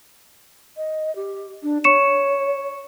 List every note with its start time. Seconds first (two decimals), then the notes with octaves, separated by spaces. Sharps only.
0.77 D#5
1.15 G4
1.63 D4
1.84 C#5 C#6 C#7 E7